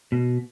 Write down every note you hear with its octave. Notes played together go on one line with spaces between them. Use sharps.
B2